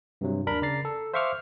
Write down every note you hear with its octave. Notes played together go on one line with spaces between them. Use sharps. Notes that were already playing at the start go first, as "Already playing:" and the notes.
G2 C3 F#3
D#2 D4 A#4 B5
C#3 D5 A#5 A6 C7
A4
C5 E5 F5 C#6 D6 F6